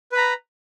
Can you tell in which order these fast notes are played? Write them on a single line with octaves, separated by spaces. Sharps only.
B4 B5 A#5